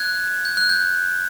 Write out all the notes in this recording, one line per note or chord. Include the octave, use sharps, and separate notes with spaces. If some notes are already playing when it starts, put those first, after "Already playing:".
Already playing: F#6 G#6
G6
F#6
G6